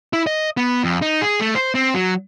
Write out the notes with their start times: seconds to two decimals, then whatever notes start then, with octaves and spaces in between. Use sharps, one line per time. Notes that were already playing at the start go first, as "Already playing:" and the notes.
0.13 E4
0.27 D#5
0.57 B3
0.84 F2
1.02 D#4
1.22 G#4
1.40 A3
1.55 C5
1.75 C4
1.94 F#3